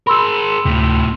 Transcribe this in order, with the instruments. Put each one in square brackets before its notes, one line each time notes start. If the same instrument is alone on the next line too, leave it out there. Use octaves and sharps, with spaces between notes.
[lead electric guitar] G#4 A#4 [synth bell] B5 C6 E6
[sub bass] D2 [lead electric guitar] A2 C3